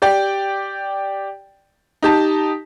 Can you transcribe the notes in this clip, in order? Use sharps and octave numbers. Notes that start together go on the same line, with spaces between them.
G4 D5 G5
D#4 G4 A5